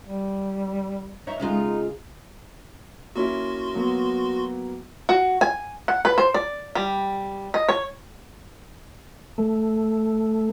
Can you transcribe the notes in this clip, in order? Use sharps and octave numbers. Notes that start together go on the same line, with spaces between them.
G3
D#4 C#5 E5
C#3 G#3 D#4 F4
A#3 C#4 E4 F#4 C6
F#3 A#3 B3
F#4
G#5
F#5
B4
C5
D5
G3
D#5
C#5
A3